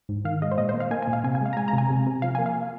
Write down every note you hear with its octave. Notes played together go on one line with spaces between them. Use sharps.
G#2
D#3 F5
G#3 D#5
C5
A#2 D#5
C5
A#3
F5
A#3 G#5
A#2 G#5
F5
C3 G#5
G#5
G#3 F5
A#5
G#3 G#5
A#5
C3 G#5
C3
C3
F3 F5
A#3 G#5
F5